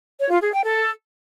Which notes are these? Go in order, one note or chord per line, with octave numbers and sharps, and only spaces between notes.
C#5
F4
G#4
G5
A4